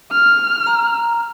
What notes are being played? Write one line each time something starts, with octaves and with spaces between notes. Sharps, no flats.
F6
A#5